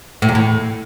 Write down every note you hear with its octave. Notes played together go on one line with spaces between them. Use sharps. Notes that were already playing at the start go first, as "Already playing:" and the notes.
A2
E2
A2